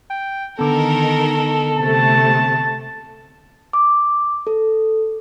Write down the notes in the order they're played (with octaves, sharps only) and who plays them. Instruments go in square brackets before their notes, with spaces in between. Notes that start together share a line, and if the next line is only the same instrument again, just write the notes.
[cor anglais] G5
[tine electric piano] D3 B3 [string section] D#3 A#4 [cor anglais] A4
[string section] C3 A3 [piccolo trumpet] A5
[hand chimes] D6
A4